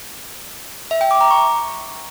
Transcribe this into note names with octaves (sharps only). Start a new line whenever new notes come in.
E5
G5
D6
A#5
C#6